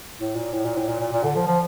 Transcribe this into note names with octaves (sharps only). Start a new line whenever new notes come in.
A2
A#2
A2
A#2
A2
A#2
A#2
A#2
D3
F3
F3